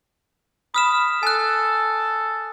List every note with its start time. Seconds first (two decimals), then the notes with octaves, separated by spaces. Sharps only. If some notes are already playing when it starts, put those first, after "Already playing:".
0.74 B5 D#6 F6 E7
1.23 A4 G#5 F#6